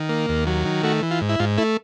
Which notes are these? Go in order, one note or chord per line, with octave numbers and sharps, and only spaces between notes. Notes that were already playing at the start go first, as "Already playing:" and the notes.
Already playing: D#3
A#3
D#2
F#3
D#3
A3 F#4
E3
F4
G#2
E4
G#2 F4
A3 E4